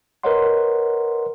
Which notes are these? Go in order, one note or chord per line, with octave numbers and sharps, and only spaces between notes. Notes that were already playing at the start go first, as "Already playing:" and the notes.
A#4 B4 C#5 D#5 F#5 C6